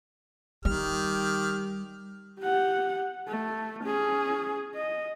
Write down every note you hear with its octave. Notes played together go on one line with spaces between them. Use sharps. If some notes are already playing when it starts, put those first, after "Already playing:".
D#3 G3 G4 F6
G4 F#5
A3
C#4 G#4
D#5